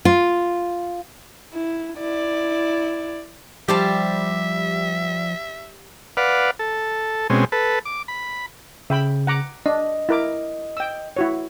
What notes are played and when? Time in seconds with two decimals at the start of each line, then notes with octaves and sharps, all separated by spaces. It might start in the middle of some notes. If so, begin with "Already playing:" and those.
0.05 F4
1.53 E4
1.98 E4 D5
3.68 F3 G3 G4 C5 E5 A5
6.17 B4 D5 F5 F#5
6.59 A4
7.30 B2 G#3 C4 C#4
7.52 A4 B4
7.85 D6
8.08 B5
8.90 C#3 E5 G5 B5
9.27 F#5 A#5 D6
9.66 D4 D#5
10.09 E4 A#4 D6
10.77 G5 E6
11.17 E4 F#4 C#5